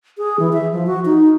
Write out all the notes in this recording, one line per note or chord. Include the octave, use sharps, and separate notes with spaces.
G#4
E3
E5
F3
F#4
D#4